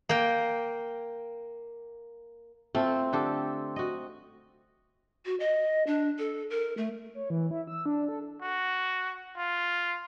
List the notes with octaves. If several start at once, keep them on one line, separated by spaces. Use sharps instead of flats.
A#3 G5
A3 C4 F4 A4
D3 G4 A4
F#4 D#5
F#4
D#5
D4
A4
A#4
A3
C#5
E3
E4
E6
D4
A4
F#4
F4